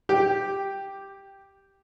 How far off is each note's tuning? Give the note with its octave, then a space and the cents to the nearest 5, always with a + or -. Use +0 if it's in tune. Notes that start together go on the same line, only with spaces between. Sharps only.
G4 +0 G5 +15